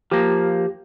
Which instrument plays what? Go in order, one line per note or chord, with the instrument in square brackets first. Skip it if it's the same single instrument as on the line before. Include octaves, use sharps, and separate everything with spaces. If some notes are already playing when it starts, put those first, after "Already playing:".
[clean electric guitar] F3 A#3 [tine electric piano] G4